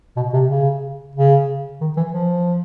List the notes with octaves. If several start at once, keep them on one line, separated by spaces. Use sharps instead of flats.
B2
C3
C#3
C#3
D#3
E3
F3